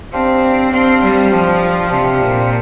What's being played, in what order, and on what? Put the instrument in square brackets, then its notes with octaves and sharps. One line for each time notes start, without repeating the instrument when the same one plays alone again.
[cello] C4 [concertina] D4 G4 C5 F5
[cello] C4 [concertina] D4 G4 C5 F5
[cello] G3
[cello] F3 [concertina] D4 G4 C5 F5
[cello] C3 [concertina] D4 G4 C5 F5
[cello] A#2